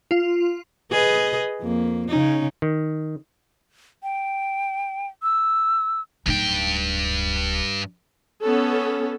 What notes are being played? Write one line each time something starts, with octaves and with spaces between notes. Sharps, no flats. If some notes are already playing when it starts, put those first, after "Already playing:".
F4
G#4 B4 D#5
F2 A#3
C#3 C#4 D#4
D#3
G5
E6
D1 G2 D#4 G5
B3 C#4 A4